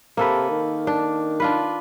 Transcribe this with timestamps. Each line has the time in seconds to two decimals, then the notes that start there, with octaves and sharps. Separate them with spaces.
0.17 C3 A#3 A4 B4
0.50 D#3
0.87 D4
1.40 D4 F4 B4